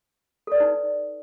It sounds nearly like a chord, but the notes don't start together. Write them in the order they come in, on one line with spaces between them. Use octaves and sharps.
A4 D5 B4 D#4